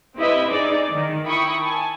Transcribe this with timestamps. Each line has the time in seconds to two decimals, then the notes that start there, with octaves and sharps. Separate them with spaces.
0.17 C4 E4 G4 B4 D#5 E5
0.48 D#4 G#4 D5
0.92 D#3
1.25 E4 A#4 G5 B5 C#6 D#6
1.63 G#5 A5